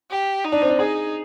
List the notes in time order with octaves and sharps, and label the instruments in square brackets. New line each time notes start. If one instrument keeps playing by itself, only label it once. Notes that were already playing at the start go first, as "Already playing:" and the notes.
[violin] G4
D#4
[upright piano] D4
C4
D4
[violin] D#4 [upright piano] G#4